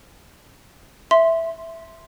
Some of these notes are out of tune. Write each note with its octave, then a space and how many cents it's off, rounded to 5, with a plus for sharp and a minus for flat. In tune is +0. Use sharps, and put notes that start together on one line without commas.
E5 +0 C6 +0